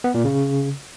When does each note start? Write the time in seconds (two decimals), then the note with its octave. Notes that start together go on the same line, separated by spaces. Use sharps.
0.04 B3
0.14 A#2
0.25 C#3